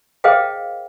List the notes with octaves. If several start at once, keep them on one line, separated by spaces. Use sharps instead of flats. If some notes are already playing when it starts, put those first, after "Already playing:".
G#4 A#4 C5 D#5 F5 G5